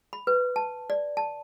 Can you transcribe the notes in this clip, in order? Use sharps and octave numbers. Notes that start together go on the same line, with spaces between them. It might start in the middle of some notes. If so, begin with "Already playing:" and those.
B5
B4
A5
D5
A5